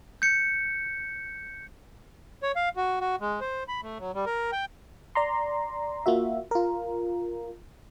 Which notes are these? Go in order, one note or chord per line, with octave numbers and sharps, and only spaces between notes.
G6 C#7
C#5
F5
F#4
F#4
G#3
C5
B5
A3
F#3
G3
A#4
G5
D5 A#5 C6
A#3 F4 F#4 E5
F4 A#4